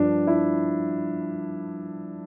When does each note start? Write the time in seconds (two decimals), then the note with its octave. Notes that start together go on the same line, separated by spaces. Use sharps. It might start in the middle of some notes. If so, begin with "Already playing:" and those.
Already playing: G2 F3 D4
0.27 E4